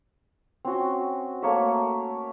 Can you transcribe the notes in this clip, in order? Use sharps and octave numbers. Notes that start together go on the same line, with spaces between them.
C4 C#4 F#4
A3 A#3 C#5 E5